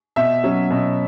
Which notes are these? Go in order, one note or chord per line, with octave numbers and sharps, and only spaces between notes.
B2 E5
F#3 C#4
B2